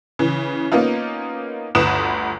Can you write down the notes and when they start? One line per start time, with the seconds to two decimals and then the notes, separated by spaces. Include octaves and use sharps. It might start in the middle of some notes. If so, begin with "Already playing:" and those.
0.19 C#3 E3
0.72 A#3 B3 C#4 D#4 F4
1.75 G1 D2 B4 D#6 F#6 E7